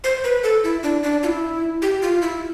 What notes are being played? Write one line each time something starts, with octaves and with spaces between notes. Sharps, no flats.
C5
B4
A4
E4
D4
D4
F4
E4
G4
F4
E4